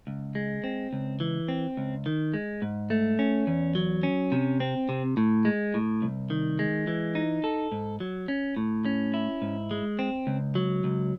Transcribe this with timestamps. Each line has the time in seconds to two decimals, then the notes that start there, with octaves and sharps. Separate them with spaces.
0.07 C#2
0.35 G#3
0.64 C4
0.93 C#2
1.20 E3
1.48 C4
1.77 C#2
2.06 D#3
2.34 G#3
2.62 G#2
2.90 A3
3.19 C#4
3.47 E2
3.75 F#3
4.03 C#4
4.32 C3
4.60 C4
4.89 C3
5.17 A2
5.45 G#3
5.74 A2
6.02 C2
6.30 D#3
6.59 G#3
6.87 E3
7.15 D#4
7.44 A4
7.72 G#2
8.00 F#3
8.28 C#4
8.57 A2
8.85 C#4
9.14 E4
9.42 G#2
9.71 G#3
9.99 C4
10.27 C#2
10.55 F#3
10.84 C#2